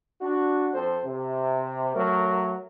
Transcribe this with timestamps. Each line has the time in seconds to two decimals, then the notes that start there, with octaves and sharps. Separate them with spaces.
0.21 D4 F#4
0.74 F2 C4 A4 C5
1.05 C3
1.95 F#3 A3 A#4